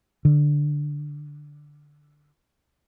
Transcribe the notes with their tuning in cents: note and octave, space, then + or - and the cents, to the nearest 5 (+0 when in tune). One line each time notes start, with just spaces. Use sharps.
D3 +0